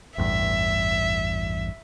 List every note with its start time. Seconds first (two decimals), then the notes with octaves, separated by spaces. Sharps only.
0.18 A1 E2 G2 E5